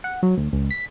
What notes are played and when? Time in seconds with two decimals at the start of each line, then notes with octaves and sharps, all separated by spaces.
0.04 F#5
0.23 F#3
0.37 D2
0.53 C#2
0.71 B6